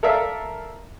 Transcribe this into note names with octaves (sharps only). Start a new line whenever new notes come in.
A4 A#4 D5 E5 F5